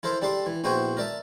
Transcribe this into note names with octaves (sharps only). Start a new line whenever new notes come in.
E4 A4 A#4 C5 E5
G3 D4 A4 A5 C6
E3
A#1 B3 E4 F#4 C5 G5
A#4 D5 E5 A5